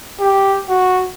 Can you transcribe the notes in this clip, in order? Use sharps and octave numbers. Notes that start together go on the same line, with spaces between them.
G4
F#4